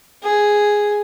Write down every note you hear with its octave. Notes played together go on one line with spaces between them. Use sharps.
G#4